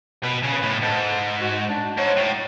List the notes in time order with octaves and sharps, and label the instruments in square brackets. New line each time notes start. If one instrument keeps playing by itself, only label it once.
[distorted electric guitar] B2 [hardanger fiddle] B4
[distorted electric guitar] C#3
[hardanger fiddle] B4
[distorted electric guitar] A2
[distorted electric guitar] G#2 [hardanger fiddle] A4
[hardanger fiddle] F#4
D4
[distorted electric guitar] G#2 [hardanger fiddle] C#5
[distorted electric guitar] A2